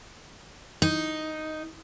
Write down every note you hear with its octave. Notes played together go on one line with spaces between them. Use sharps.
D#4